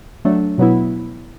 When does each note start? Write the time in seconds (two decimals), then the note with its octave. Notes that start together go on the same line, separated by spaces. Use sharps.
0.25 F#3 A3 D4
0.58 B2 F#3 B3 E4